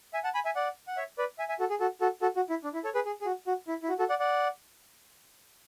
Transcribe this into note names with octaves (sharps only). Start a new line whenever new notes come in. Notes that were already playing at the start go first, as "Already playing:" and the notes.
E5 G#5
F#5 A5
G#5 B5
E5 G#5
D5 F#5
F#5
C#5 E5
B4 D5
E5 G#5
E5 G#5
F#4 A4
G#4
F#4 A4
F#4 A4
F#4 A4
F#4
E4
D4
E4
A4 C#5
G#4 B4
G#4
G#4
F#4
F#4
E4
E4
F#4
F#4 A4
D5 F#5
D5 F#5